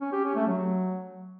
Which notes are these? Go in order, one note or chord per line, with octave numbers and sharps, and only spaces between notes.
C#4
G4
C#4
A3
F#3